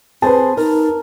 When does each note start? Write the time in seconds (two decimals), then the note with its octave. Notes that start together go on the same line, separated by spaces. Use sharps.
0.22 C4 G#4 B4 C5 A5
0.57 D#4 A#4